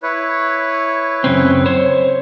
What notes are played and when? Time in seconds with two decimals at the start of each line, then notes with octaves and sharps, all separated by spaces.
0.03 E4 B4 C#5
1.24 F#2 C#3 C4
1.66 C5 C#5